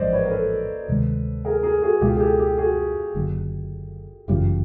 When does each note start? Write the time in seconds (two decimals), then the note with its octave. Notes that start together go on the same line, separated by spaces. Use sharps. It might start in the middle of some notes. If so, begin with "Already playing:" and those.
Already playing: A1 G#2 F3 C5 D5 D#5
0.13 B4 C#5
0.24 A#4
0.31 A4 B4
0.88 D2 C3 D#3 G#3
1.45 G#4 A#4
1.63 G#4 A#4
1.82 F#4 G#4
2.01 C#2 B2 G#3 F4 G4
2.16 G#4
2.20 G4 A4
2.39 G4 A4
2.58 F#4 G#4
3.15 F#1 F#2 D3
4.28 G1 F#2 C#3 E3 F4 G4